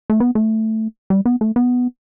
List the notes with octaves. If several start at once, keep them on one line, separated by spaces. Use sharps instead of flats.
A3
B3
A3
G3
B3
A3
B3